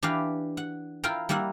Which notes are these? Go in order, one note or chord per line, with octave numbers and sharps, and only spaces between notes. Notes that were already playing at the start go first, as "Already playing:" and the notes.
E3 D4 G4 B4 F5
F#5
E4 F4 A#4 F5 G5 A#5
G3 A#3 E4 A#4 F#5